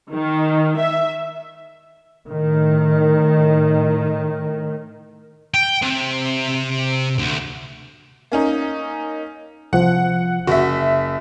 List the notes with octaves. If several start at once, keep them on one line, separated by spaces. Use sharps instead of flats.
D#3
E5
A2 D#3
G5
C3
D2
A#3 C#4 D#4
C2 F3 F#5
F#1 F#4 E5